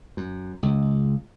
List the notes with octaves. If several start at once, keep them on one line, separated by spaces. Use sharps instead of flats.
F#2
C#2